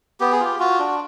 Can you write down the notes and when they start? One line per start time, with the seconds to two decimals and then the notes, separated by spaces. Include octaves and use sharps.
0.20 B3 G4
0.32 G#4
0.40 F4 G4
0.60 F4 F#4
0.79 D4